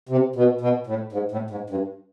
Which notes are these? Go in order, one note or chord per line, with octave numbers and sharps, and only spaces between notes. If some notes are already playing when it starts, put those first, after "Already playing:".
C3
B2
B2
A2
G#2
A2
G#2
G2